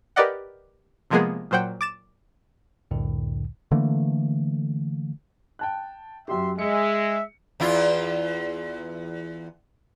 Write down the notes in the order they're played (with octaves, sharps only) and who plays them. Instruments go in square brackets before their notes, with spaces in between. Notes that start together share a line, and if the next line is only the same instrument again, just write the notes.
[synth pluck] G4 A#4 B4 D5 D#5 F#5
C3 F3 G#3 A#3 B3 G#4
A#2 F#3 C5 F#5 G5
D6 A6 E7
[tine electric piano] C2 F2 A2 D3
[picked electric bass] D3 E3 A3 A#3
[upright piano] G5 A5 F#6
[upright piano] F#2 G4 [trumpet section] E5 C6
[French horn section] G#3 [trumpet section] E5 [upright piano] C#7
[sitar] E2 E4 F4